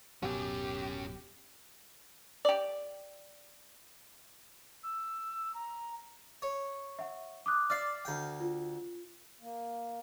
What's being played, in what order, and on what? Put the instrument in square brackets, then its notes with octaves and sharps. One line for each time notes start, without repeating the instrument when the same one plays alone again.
[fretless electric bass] D1 B2 F#3 [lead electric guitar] F#2 C#4 [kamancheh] G4
[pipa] G4 D5
[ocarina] E6
A#5
[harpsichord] C#5
[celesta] E5 F#5
D6 D#6 F#6
[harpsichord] D5 E5 [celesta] F6 C7
[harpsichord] D2 G5
[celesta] F4
[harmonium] A#3